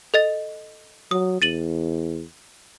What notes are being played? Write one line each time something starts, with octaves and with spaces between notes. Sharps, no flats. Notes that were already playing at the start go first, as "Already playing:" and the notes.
A4 D#5 A6
F#3 D#6
E2 A6 D#7 F#7